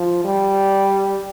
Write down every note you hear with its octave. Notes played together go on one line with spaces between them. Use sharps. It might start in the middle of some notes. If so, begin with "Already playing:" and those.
Already playing: F3
G3